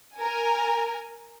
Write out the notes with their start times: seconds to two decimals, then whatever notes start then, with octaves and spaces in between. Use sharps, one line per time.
0.15 A#4 G#5